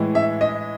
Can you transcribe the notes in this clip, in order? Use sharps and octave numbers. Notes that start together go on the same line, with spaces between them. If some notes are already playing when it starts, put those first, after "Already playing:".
Already playing: A2 E3 G#3
E5
D#5